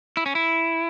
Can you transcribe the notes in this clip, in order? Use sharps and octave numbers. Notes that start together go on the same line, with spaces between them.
E4
C#4
E4